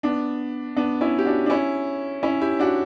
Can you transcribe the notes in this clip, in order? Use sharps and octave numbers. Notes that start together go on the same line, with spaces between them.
B3 D4
B3 D4
C#4 E4
G4
D4 F#4
D4
C#4 E4
C#4 E4
E4 G4
D4 F#4